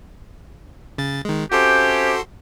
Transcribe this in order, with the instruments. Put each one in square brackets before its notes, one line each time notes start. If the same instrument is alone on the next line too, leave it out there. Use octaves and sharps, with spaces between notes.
[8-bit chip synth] C#3 A6
D#3 G#3
[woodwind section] C3 C#4 G4 [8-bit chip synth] F#4 A4 C6